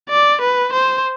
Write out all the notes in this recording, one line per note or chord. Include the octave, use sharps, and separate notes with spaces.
D5
B4
C5